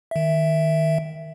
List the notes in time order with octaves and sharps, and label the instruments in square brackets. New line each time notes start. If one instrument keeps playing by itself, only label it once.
[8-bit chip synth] D#3 E5